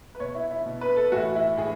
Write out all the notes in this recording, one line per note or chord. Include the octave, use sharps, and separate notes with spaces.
B4
B2 C#5
E4
E4
B2
B4
A4
A2 E3 F#4
E4
A2 E3 G#4